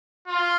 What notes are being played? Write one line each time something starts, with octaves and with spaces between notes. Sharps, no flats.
F4